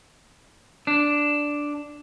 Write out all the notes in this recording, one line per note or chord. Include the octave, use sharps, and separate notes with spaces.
D4